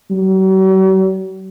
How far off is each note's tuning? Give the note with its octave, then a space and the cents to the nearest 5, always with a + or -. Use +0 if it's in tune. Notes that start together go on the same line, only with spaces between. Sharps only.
F#3 +45